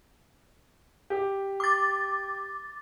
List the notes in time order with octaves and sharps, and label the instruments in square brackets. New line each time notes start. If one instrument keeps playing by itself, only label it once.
[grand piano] G4
[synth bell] D6 A6